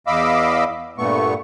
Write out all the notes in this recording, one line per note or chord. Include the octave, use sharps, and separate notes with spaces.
E2 D#5 F5 B5 D6 E6
G2 A#2 A3 B3 C#6